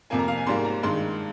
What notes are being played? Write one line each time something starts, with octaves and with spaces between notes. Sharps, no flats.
F2 C3 F3 A#3 G#5
A#5
F5
G#5
G#2 G3 A#3 C6
A#5
G2 D#3 G#3 C6